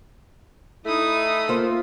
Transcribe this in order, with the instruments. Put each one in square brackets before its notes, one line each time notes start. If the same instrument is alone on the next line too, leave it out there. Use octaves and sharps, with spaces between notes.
[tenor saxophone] A3 [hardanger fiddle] D#4 D#6 [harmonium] E4
[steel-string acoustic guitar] A#3 C5 [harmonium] F4